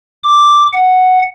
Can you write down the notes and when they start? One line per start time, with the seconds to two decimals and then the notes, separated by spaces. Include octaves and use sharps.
0.24 D6
0.73 F#5